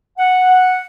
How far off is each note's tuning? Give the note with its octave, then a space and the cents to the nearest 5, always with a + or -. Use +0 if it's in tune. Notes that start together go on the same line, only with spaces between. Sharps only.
F#5 -5